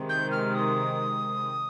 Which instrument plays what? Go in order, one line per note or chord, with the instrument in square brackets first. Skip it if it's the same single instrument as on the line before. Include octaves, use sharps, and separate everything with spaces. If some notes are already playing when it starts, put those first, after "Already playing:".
Already playing: [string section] C3 D#3 G#3 C4
[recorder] G6
F6
D#6